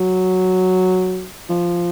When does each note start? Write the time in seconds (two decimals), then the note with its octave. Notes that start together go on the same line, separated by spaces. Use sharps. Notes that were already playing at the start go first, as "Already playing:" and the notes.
Already playing: F#3
1.49 F3